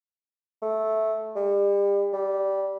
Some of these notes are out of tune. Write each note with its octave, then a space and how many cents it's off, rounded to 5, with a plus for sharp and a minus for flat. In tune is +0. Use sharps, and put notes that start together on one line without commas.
A3 -10
G3 +35
G3 -10